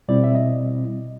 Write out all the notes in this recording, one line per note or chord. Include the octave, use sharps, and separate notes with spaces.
B2 G3 C4 E4 D5
E5
D#5